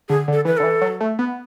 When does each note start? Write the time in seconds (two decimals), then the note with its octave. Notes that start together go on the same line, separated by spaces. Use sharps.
0.09 D3 G#4
0.28 D3
0.33 A4
0.45 E3 B4
0.57 D3 A4
0.63 E3
0.81 F#3
1.01 A3
1.19 B3